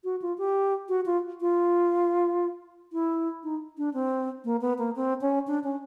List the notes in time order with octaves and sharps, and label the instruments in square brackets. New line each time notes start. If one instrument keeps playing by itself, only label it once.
[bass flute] F#4
F4
G4
F#4
F4
F4
E4
D#4
D4
C4
A#3
B3
A#3
C4
C#4
D4
C#4